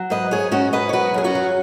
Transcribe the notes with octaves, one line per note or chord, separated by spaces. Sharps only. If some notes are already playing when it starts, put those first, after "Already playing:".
Already playing: F#3
G#2 B4 D#5
G#2 G#4 C#5
G#2 C#4 F#4
G#2 B4 D#5
C#5
F#3 F#4 B4
F#2 G#4
C#4 F#4
F#3